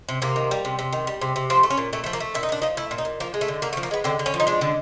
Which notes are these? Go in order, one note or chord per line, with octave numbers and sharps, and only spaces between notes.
C3
C3 A#3
D#3
G3
C3
C3
D#3
G3
C3
C3
F3 C4
A3
C#4
A#2
A#2 A3
F3 A3
A#3
A3
A#2 E4
D#4
A#2 D4
F3 D#4
A3 E4
A#2
D#4
A#2
F3 A#3
G#3
A3
D3
D3 A#3
A3
F3
A#3
G#3 B3
D3 C4
D3
C#4
F3
D#4
G#3 D4
D3